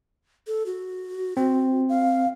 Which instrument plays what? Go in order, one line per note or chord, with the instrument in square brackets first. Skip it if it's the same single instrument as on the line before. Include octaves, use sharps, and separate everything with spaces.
[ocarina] A4
F#4
[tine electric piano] C4 [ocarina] F#4
[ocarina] F5